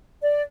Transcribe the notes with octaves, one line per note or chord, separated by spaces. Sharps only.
D5